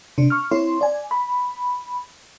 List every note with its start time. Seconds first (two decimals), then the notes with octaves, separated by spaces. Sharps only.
0.18 C3 D4
0.30 C#6 F6
0.51 C4 E4 C#5 C6
0.81 D5 G#5
1.11 B5